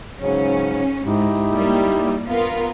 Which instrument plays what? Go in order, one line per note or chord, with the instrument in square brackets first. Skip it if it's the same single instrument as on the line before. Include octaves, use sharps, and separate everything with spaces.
[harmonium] G#2 C#3 F#3 [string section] C#4
[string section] G#2 [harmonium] D#4 E4 G4
[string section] G3 A#3
[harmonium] G2 [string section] B3 F4 A#4